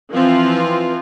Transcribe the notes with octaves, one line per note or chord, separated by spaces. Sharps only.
E3 F3 C4 F4